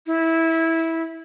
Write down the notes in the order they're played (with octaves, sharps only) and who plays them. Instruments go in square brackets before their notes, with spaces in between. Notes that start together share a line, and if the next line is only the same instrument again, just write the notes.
[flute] E4